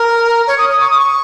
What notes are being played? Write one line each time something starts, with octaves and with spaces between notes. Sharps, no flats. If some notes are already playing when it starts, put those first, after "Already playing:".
Already playing: A#4
C#5
D#6
D#6
C#6
D#6
C#6